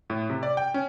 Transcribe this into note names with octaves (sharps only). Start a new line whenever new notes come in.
A2
C3
D5
G5
C#4